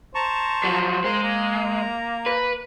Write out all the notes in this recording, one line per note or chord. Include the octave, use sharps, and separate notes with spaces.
C5 A5 A#5 C#6
F3 F#3
G#3 A#4 C5 F5
A#3 A#5
B4